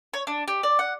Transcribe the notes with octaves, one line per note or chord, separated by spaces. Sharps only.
C#5
D4
G4
D5
F#5